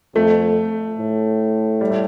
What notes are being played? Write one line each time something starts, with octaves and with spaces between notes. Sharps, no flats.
F2 A3
A2
G3
A3